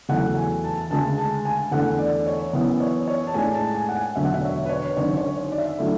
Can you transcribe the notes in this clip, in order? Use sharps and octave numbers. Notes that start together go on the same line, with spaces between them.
E2 C#3 F#3 A3 E4 F#5
G#5
A5
D2 C#3 G#3 A5
A5
G#5
E2 D3 A3 E4 F#5
D5
C#5
F#2 E3 B3 E4
C#5
C#5
A5
A2 G#3 D4 G#5
A5
G#5
F#5
G#5
E1 D2 D3 F#3 E5
F#5
E5
C#5
B4
C#5
G#1 F#2 D3 C#5
C#5
D5
E5
D3 F#3 A3 E4